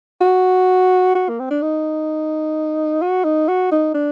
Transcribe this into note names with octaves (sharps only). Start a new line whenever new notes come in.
F#4
F#4
A#3
C4
D4
D#4
F#4
D#4
F#4
D#4
D4